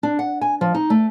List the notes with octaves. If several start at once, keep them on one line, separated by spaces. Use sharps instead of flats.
D4
F#5
G#5
F3
D#4
A3